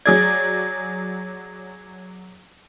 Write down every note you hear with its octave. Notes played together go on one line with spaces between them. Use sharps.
F#3 G#4 D5 G#6